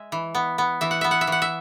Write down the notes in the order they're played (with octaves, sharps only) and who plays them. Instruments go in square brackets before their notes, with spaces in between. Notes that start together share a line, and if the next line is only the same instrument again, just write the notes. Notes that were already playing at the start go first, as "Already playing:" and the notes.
Already playing: [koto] G#3 E5
E3
B3
B3
E3 E5
F#5
B3 E5
F#5
E5
E3 F#5
E5